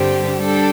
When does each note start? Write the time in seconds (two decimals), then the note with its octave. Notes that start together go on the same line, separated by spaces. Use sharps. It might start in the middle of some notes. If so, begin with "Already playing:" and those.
Already playing: G2 D3 G3 C4 G4
0.40 G3 D4 A4